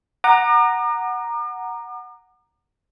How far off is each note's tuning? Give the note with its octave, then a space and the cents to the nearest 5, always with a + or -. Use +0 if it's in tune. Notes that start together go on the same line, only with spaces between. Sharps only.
F#5 +0 A#5 +0 D6 +45